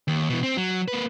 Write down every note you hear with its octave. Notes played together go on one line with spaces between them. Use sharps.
D#2
B2 E3
C4
F#3
A#3 B4